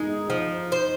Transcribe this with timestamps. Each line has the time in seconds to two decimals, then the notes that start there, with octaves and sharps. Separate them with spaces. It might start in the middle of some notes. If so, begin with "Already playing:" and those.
Already playing: G#3 D#4
0.30 F3
0.72 C5